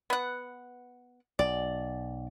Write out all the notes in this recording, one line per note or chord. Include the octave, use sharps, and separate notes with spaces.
B3 F#5
B1 D5